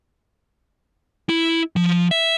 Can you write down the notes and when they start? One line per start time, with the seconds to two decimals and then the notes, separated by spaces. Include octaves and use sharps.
1.29 E4
1.76 F3
2.11 E5